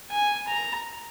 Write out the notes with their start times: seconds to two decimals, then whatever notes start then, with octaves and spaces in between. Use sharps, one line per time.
0.11 G#5
0.48 A#5